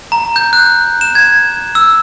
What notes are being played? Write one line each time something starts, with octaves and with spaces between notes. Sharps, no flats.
A#5
G6
F#6
E7
G#6
E6